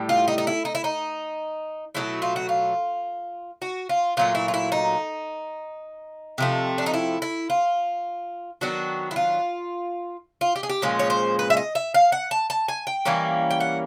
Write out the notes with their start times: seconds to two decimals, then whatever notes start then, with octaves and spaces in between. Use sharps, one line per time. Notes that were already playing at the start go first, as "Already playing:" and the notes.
Already playing: A2 G3
0.09 F4
0.28 D#4
0.38 D#4
0.47 E4
0.65 D#4
0.75 E4
0.84 D#4
1.95 B2 F#3 A3 E4
2.22 F4
2.36 F#4
2.49 F4
3.62 F#4
3.89 F4
4.17 A#2 F#3 A3 F4
4.35 E4
4.48 F4
4.54 E4
4.72 D#4
6.38 C3 F3 A3
6.78 D4
6.86 D#4
6.94 E4
7.22 E4
7.50 F4
8.61 D#3 F#3 B3 D4 F#4
9.11 E4
9.16 F4
10.41 F4
10.56 G4
10.63 G#4
10.69 G4
10.82 A#2 F3 G#3 C#4
10.99 C#5
11.10 C5
11.39 B4
11.50 E5
11.57 D#5
11.75 E5
11.94 F5
12.12 F#5
12.31 A5
12.50 A5
12.68 G#5
12.87 G5
13.05 E3 G3 A#3 C#4
13.50 G5
13.60 F#5